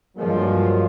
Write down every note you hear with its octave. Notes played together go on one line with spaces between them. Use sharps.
G2 F3 F#3 G#3 A#3